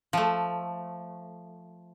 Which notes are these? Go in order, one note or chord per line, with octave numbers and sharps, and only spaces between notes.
F3 A3